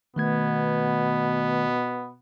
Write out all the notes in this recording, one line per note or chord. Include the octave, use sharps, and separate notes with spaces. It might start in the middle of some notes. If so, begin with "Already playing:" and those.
B2 D#3 A3 B3 G#6